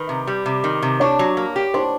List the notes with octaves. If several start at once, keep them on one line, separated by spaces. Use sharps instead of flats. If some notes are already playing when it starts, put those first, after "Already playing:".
Already playing: D#3 B4 B5
C3
G3
C3
D#3
C3
D4 C#5 C#6
F#3
A#3
G4
D4 C5 C6